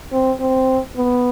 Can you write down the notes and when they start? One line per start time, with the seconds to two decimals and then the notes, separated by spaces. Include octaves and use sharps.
0.12 C4
0.39 C4
0.97 B3